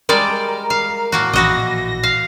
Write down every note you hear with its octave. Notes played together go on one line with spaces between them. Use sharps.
G3 G#3 A#4 D5
F5
A2 A#3 F#4
A#1 E3 F#4 D#5 A#6
F5